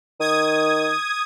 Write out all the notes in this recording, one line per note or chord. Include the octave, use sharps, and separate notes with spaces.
D#3 D#6 G#6